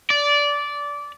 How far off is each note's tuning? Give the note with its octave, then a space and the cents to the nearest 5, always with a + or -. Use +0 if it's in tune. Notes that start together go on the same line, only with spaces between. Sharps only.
D5 -15